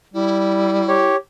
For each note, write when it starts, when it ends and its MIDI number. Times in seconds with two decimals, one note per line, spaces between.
0.14 1.07 55
0.14 1.12 64
0.88 1.16 67
0.88 1.16 73